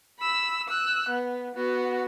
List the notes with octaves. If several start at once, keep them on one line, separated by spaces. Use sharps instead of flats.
B5 E6
E6 F#6
B3
B3 F#4